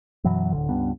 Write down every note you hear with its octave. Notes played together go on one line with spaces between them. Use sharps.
F#2 B2 E3 F#3
D1 F#2 D3
C#2 G2 B3